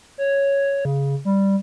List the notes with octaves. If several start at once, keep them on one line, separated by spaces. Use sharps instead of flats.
C#5
C#3
G3